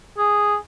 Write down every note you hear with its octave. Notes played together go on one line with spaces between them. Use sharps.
G#4